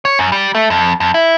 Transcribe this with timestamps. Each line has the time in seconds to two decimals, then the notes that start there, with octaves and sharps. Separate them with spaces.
0.05 C#5
0.19 F#2
0.32 G3
0.55 A3
0.70 F2
1.00 F2
1.14 E4